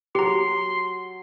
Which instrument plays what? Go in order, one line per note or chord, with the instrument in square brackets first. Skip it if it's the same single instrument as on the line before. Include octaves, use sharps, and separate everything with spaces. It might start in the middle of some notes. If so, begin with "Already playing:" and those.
[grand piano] F#3 [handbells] G4 A#5 [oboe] C6